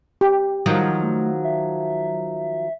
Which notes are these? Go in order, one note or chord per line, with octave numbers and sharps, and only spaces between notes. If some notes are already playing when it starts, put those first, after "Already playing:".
G4
D#3 F3 F#3
A3
E5